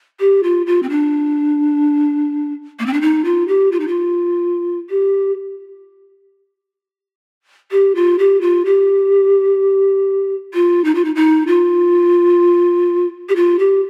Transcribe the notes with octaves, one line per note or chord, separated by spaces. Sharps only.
G4
F4
F4
C4
D4
A#3
C4
D4
D#4
F4
G4
F4
D#4
F4
G4
G4
F4
G4
F4
G4
F4
D#4
F4
D#4
D#4
F4
G4
F4
G4